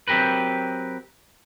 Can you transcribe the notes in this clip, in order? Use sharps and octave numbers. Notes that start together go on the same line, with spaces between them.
F#3 C4 G4 A#4 B4